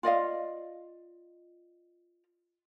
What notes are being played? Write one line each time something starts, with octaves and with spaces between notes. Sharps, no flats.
F4 D5 D#5 F5